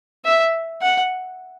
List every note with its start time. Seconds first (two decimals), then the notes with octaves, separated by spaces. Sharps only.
0.25 E5
0.82 F#5